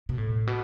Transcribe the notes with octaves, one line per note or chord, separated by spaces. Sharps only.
B2
A2
B2